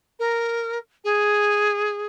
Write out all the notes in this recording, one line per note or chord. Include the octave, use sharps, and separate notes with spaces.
A#4
G#4